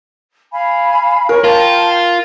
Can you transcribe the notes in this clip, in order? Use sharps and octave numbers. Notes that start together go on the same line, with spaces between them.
F5 G#5 B5
A#4 C#5 C#6
F4 G5 A5